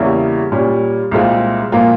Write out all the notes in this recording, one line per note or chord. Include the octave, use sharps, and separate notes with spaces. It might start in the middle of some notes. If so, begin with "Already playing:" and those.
Already playing: E2 C#3 G3 A#3 E4
A#2 G3 C#4
C2 A#2 G#3 C4 F4
A#2 F3 A#3 F4